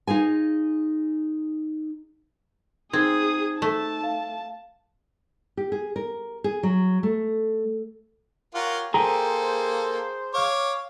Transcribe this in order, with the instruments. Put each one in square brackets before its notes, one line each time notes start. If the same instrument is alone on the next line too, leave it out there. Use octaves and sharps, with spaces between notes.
[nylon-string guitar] D#4 F4 G#4 G#5
[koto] C4 [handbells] D#4 [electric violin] G#4 D#6 [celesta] G#6
[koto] A3 [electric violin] A5
[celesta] F5
[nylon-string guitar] G4
G#4
A#4
G#4
F#3
A3
[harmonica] F4 A#4 F#5 [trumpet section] G4 C#5
[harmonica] A#3 A4 [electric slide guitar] G#4 G5 G#5 [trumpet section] C5 [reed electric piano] A#5
[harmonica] C#5 D6 [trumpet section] F5